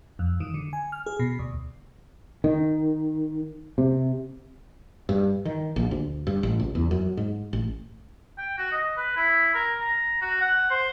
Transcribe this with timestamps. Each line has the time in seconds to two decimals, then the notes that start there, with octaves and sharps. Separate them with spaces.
0.19 F2
0.40 D#3
0.54 D3
0.73 G#5
0.92 F6
1.06 G#4
1.19 B2
1.39 D2
2.44 D#3
3.78 C3
5.09 G2
5.45 D#3
5.76 A#1
5.91 D2
6.27 G2
6.43 A1
6.60 C#2
6.75 E2
6.91 F#2
7.17 G#2
7.53 A1
8.38 G5
8.58 F#4
8.72 D#5
8.97 B4
9.16 E4
9.55 A#4
9.81 A#5
10.21 F#4
10.41 F#5
10.70 C5